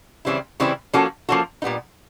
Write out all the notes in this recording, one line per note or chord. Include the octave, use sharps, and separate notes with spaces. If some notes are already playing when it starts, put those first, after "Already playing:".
C#3 E3 G3 C4 E4
C#3 E3 G3 C4 E4
F3 A#3 C#4 F#4 A4
F3 A#3 C#4 F#4 A4
A#2 G3 B3 D#4